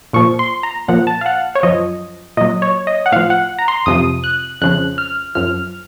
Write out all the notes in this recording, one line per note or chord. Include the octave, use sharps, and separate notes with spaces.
A#2 F3 C#6
C6
A#5
A#2 F3 F#5
A5
F5
F#5
C#5
F#2 F3 D#5
A#2 F#3 D#5
C#5
D#5
F#5
A2 F3 F5
F#5
A#5
C6
F2 C3 F3 D#6
F#6
F2 C#3 F3 F#6
F6
F#2 F3 F6